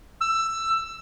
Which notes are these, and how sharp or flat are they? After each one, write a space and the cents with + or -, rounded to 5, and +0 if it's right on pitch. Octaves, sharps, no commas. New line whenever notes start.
E6 +15